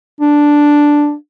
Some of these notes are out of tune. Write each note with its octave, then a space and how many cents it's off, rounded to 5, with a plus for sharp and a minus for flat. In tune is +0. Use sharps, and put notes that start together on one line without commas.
D4 +0